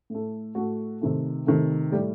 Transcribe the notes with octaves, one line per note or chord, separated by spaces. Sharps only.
A2 A3
A2 A3 F#4
C3 D#3 A3
C3 D#3 A3
A2 G3 G4